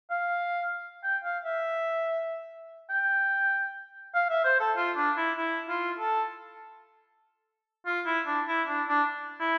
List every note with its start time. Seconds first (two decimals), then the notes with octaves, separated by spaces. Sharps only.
0.11 F5
1.04 G5
1.24 F5
1.45 E5
2.90 G5
4.14 F5
4.30 E5
4.44 C5
4.60 A4
4.76 F4
4.96 D4
5.17 E4
5.37 E4
5.69 F4
5.99 A4
7.86 F4
8.06 E4
8.27 D4
8.48 E4
8.68 D4
8.88 D4
9.40 E4